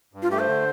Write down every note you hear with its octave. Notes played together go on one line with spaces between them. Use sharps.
G2
F4
A3 G4
C5
D3